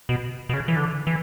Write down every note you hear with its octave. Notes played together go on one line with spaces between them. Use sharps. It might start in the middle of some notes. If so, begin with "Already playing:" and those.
B2
B2
C#3
E3
D3
E3